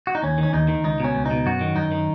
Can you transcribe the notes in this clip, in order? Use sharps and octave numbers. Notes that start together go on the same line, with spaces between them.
F#4
D#4
D#2 C#4
D#3
C#4
D#2 D#4
D#3
C#2 D#4
B2 C#4
C#2
D#4
B2
F#2 F#4
D#3
F#2 D#4
D#3